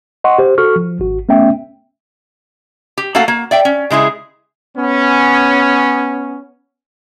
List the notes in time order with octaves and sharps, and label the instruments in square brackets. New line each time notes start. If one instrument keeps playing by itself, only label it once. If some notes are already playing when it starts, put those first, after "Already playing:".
[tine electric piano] D#5 F#5 C6 C#6
G4 C5
F#4 A4 C#6 F6
F3
G#1 F#4
A3 B3 C#4 E5 G5
[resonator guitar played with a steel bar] G4
A3 A#3 F#4 A4 F5 F#5
A#3
D5 E5 G5
C#4
C#3 G#3 E4 G#4
[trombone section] B3 C#4